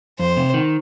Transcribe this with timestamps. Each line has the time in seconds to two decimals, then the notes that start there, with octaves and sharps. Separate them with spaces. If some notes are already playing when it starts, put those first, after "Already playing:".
0.19 F2 C5
0.37 C3
0.54 D#3